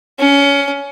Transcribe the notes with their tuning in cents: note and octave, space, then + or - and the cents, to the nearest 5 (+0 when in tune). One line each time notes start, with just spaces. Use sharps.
C#4 +20